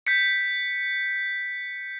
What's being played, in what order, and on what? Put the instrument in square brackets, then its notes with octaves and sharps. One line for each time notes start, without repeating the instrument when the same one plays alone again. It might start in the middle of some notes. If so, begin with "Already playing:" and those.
[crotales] G6 B6 C#7